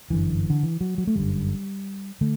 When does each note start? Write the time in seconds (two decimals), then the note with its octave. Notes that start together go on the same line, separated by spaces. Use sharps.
0.10 G1 F#2 D3 E3
0.50 D3
0.63 E3
0.81 F#3
0.98 F#3
1.07 A3
1.16 G1 F#2 D3 G3
2.21 D3 A3